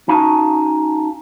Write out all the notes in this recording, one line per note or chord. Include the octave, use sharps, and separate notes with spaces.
C#4 D#4 F#4 F5 G#5 A5